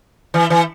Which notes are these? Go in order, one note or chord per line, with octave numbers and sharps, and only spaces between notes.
E3
E3